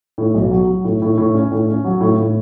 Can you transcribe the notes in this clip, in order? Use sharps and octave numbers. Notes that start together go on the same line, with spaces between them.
A2
B1
F#3
F#3
A2
A2
A2
C#4
A2
C#4
F#3
A2
A2